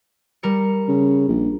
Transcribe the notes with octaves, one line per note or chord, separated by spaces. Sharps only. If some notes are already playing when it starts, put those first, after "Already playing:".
G3 A#4 C#7
C#3
A#1